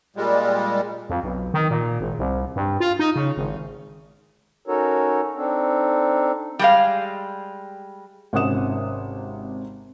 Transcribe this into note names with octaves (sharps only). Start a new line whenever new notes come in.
A#2 G3 G#3
F2
B1
D#3
A#2
G#1
C2
G2
F4
D#4
C#3
G#1
C#4 D#4 F#4 A4 A#4 C#5
C4 D4 D#4 A4
G3 G#3 F5
G#1 C3 C#4 F#5 D#6 E7